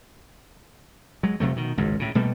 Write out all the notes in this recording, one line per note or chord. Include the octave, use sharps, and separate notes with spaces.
F#3 G#3
F1 C3 F#3 A3
B2 D#3
G#1 C#2 F#2
A2 C#3
B2 G3 A3 A#3